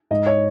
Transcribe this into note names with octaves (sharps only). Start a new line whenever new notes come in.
G#2 D#5
C#5